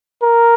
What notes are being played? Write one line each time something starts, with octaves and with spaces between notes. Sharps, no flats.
A#4